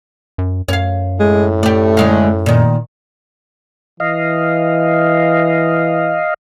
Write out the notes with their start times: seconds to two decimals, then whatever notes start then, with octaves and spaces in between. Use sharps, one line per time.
0.38 F#2
0.68 F#2 C#5 F5
1.20 A2 G#3
1.63 A3 G4 D5
1.97 D3 G#3 F5
2.46 A#2 D#3
4.00 E3 D#5 F5